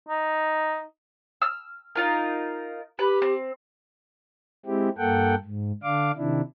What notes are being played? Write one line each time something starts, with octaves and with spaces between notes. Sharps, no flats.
D#4
E6 F6
D#4 F4 A#4
G4 B4
C4
G#3 C4 E4 G4
G2 A#3 A4 F#5 G5
G#2
D3 D4 F5 D6
C3 D#3 D4 E4